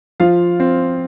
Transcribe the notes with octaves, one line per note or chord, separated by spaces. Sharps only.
F3 F4 F5
C4